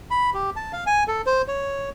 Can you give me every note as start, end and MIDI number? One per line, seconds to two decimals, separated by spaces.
0.11 0.30 83
0.34 0.50 67
0.56 0.72 81
0.73 0.84 77
0.87 1.04 80
1.08 1.22 69
1.26 1.42 72
1.48 1.90 73